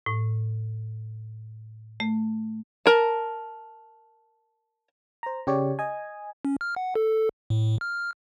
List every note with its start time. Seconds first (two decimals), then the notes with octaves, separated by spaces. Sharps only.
0.06 A2
2.00 A3
2.86 A#4 A5
5.23 C5 A#5
5.47 C#3 G4 C#5 D5
5.79 D#5 G#5
6.45 C#4
6.61 F6
6.76 F#5
6.96 A4
7.50 A2
7.81 F6